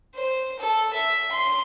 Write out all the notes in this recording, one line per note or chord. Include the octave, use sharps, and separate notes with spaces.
C5
A4
E5
C6